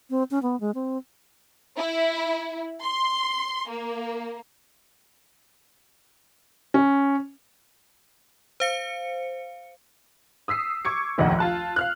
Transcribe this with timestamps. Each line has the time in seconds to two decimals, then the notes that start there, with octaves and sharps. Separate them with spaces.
0.10 C4
0.31 C#4
0.43 B3
0.60 G#3
0.75 C4
1.77 E4
2.81 C6
3.69 A#3
6.74 C#4
8.60 C5 F5 C#7
10.48 D#6 E6 B6 C7
10.85 C#6 D6 G#6 C#7
11.18 F1 A#1 D#2 D#5 F#5
11.39 F4 A5 F#6
11.76 F5 F6 F#6